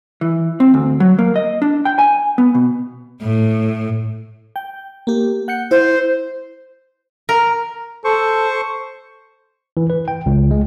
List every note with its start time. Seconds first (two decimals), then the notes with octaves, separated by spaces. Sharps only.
0.21 E3
0.60 C4
0.74 D2
1.00 F#3
1.19 A#3
1.36 D#5
1.62 D4
1.85 G5
1.99 G#5
2.38 B3
2.55 B2
3.22 A2
4.56 G5
5.07 A#3 G4
5.48 F#5 G6 C#7
5.71 E4 C5
7.29 A#4
8.05 A4 C5 C#6
9.77 E3
9.90 B4
10.08 G5
10.26 C#2
10.51 G#3